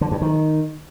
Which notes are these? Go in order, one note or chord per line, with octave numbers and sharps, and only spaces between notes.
D3
G2
D#3